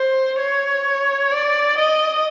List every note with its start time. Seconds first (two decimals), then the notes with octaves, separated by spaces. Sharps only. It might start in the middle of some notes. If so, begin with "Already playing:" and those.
Already playing: C5
0.39 C#5
1.31 D5
1.78 D#5